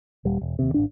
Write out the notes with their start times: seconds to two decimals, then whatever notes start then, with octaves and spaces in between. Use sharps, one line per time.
0.25 D#1 G3
0.41 E1
0.59 D#2 C3
0.74 G#1 C#2 D4